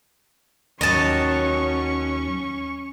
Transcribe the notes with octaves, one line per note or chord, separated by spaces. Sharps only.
D#2 F#3 C#4 D#5 A5 C#6